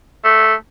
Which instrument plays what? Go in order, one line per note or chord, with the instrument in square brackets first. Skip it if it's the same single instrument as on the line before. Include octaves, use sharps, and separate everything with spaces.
[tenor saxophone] A3